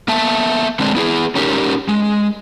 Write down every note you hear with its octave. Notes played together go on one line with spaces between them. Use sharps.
A#3 B3 E5 A5
D3 G#3 C4 D4
B3 E4 G4 G#4
C#4 D#4 G4 A#4
G#3